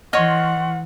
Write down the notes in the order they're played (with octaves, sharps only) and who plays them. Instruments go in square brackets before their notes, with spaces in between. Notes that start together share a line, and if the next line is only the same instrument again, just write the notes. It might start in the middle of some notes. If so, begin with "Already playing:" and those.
[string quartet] E3 [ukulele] C#5 D#5 [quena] F#5 [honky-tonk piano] C6 C#6 F6